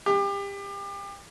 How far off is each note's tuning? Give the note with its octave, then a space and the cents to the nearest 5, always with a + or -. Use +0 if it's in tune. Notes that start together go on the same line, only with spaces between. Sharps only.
G4 +30